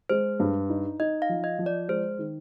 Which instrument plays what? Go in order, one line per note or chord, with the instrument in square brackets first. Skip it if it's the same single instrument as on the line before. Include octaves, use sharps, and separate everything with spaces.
[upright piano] G#3 [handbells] C5
[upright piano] G2
D#4
[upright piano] D#4 [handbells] D#5
[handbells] F5
[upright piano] F3
[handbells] D#5
[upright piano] F3
[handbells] D5
[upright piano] G#3 [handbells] C5
[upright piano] D#3